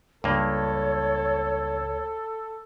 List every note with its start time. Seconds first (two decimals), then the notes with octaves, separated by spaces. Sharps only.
0.24 C#2 G2 A#3 A4 C#5